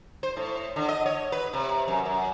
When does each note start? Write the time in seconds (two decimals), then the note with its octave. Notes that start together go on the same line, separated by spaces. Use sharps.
0.23 C5
0.37 A2
0.76 D3
0.88 D#5
1.06 C#5
1.32 B4
1.53 C3
1.88 F#2
2.05 F#2